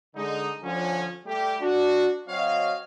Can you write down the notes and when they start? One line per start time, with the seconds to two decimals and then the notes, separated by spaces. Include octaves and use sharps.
0.16 D3 G#3 D#4
0.63 D3 F3 C#4
1.25 G3 A3 G4
1.61 D4 F#4
2.28 F#3 C4 F#4 C#5 D#5 F5